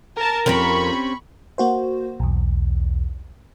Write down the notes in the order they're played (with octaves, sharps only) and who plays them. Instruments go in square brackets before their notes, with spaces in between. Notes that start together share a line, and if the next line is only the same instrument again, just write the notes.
[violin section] A#4 A5
[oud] F2 A#4 [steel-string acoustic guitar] C4 C#4 G4 [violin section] B5 C#6
[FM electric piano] A#3 F#4 C5
B1 E2